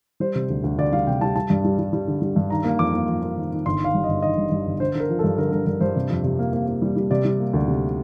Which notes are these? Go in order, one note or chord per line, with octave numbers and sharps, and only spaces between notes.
G3 C5
C3
D2
D2
D2 D5
G3 F5
C3 G5
G3 A5
G3 A5
G2
G3
G3
G3
D3
G3
G2
D#3 A#5
A#3
F2 D6
A#3
F2
A#3
D#3
D#3
G1 C6
D#3 F5
G2
G1 D#5
D#3 D#5
G2
G2
G1
D3 C5
D3
A#4
F3
G2 A4
D3 A#4
G2 A#4
G2 A#4
G2 C5
C3
F2
C3
A#3
A#3
A#3
G3
G3
C3 D5
G3
A#3
D2
C3